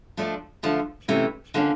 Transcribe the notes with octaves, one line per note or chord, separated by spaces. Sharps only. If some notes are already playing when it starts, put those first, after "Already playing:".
F3 A3 D4
D3 F3 A3
C3 E3 A3 C#4
D3 F3 A#3 C#4